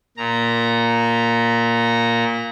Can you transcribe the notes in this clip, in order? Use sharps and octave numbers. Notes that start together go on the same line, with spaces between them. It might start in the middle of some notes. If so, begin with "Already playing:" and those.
A#2 A#5